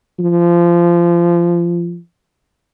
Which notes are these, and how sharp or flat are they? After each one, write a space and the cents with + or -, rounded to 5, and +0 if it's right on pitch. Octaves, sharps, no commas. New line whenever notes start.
F3 -20